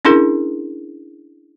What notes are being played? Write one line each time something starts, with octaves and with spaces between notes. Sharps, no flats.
C#4 D4 E4 G#4 A#4